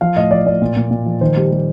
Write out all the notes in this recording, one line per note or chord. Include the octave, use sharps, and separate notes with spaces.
F3 F5
A2 D#5
F3 D5
A2 D5
A#2
A#2
A#2
F3
D#3 C5
G3
G3